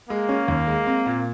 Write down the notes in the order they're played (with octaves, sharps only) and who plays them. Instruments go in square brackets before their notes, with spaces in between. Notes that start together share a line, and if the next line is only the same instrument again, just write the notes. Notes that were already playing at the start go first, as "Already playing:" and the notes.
[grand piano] G#3 [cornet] A#3
[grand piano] C#4
D#2
G#3
C4
A#2